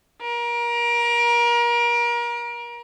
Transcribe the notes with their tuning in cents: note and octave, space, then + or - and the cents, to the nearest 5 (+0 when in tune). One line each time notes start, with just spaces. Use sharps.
A#4 +30